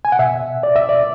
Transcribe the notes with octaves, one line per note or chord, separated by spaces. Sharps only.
G#5
F#5
B2 E5
D5
E5
D5